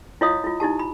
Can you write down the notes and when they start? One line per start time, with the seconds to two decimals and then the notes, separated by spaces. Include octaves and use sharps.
0.21 E4 F4 C#5 D#5 F5 D#6
0.44 E4 F4
0.60 D#4 E4 G4 A5
0.79 B5